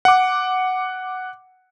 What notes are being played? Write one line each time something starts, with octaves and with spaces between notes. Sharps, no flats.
F#5 D6